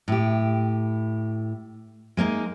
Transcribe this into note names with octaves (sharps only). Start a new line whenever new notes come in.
A2 G4
G#3 A#3 D4 D#4